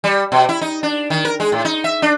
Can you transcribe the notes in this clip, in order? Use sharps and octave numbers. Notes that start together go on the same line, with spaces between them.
G3
B2
E4
D#4
D4
D#3
A#4
G#3
A2
D#4
E5
D4